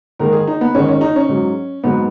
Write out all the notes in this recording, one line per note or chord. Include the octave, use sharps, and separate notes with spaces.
G#2 D#3 G#3 A#4
G#4
D#4
B3
G#2 D#3 G#3 C#4
C#4
D#4
C#4
G#2 F#3
G#2 F#3 B3